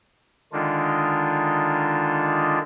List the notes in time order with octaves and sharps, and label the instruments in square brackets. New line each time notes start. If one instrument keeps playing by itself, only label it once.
[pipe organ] D3 D#3 G#3 D4 D#4 F4